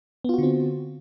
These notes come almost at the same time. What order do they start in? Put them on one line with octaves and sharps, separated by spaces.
B3 F4 F#4 D3 C4